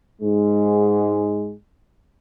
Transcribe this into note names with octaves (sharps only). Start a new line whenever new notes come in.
G#2 G#3